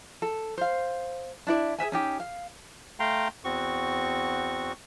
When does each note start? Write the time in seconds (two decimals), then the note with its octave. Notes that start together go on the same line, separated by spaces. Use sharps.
0.22 A4
0.58 C5 F5
1.47 D4 E4 D5
1.78 G#4 B4 E5 G#5
1.92 C#4 D#4 G4
2.20 F5
3.00 A3 F5 G5 A#5 C6
3.44 E2 C4 F#4 C#6